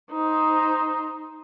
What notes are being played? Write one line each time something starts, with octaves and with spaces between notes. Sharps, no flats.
D#4 C5